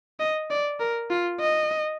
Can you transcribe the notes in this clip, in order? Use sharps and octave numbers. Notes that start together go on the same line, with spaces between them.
D#5
D5
A#4
F4
D#5